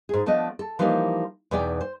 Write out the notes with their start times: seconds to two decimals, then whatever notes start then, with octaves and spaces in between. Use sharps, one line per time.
0.09 G#2 G#4
0.26 F3 A3 B3 D4 D#5
0.59 A4
0.79 E3 F3 G3 A#3 D#4 G4
1.51 E2 B2 E3 D#4 D5 G5
1.81 C5